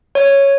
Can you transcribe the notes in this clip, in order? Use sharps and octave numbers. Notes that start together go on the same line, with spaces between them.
C#5